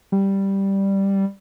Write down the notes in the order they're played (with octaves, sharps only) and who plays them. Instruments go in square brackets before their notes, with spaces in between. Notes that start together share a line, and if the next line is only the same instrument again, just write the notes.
[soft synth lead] G3